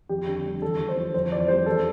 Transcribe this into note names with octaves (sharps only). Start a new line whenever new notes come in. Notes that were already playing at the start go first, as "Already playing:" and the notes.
F2 G4
D3
G3
E2 A4
D3
C5
F3
F2 C5
E3 D5
G3 C5
E2 A4